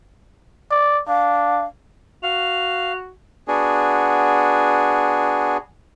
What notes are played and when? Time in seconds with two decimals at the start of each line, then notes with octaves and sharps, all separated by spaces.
0.71 D5
1.08 D4 F5
2.23 F#4 F5 F7
3.48 B3 D4 F#4 G#4